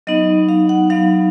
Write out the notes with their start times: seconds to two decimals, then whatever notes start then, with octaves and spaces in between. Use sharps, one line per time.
0.07 F#3 B3 D#4 D#5
0.49 F5
0.69 F#5
0.90 F#3 B3 D#4 F5